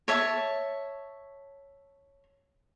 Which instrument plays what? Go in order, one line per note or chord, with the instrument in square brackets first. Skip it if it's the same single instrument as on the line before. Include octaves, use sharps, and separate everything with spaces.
[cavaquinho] C#5 E5 A5